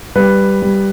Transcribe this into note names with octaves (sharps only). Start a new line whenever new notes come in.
G3 B4
G3